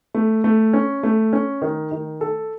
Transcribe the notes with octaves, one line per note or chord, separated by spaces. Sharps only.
A3
A3
C#4
A3
C#4
D#3
D#3
A4